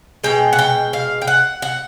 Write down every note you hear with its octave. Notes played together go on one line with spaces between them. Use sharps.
B2 G#3 G5
F#5
G5
F5
G5
F#5
F#5